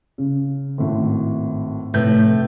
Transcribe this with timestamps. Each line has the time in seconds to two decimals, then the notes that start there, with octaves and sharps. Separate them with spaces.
0.18 C#3
0.78 G#1 A2
1.94 F1 A2 B4 G6